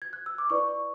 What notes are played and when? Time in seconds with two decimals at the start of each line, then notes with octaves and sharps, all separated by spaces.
0.02 G#6
0.13 F#6
0.26 E6
0.38 D6
0.50 E4 B4 D5 C#6
0.68 C#6